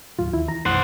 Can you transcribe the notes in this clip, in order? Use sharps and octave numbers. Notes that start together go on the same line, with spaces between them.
D#2 A2 F#3 F4
D#2 E3 E4
E3 A#5
B1 F#2 E3 C5 F#5